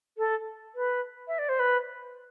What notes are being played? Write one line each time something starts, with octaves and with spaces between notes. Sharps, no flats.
A4
B4
E5
D5
C5
B4